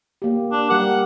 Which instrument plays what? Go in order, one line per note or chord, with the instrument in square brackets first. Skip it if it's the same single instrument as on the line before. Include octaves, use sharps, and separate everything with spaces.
[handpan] A#3 G4
[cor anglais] D4
[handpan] G3 G4 A#4 [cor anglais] F#5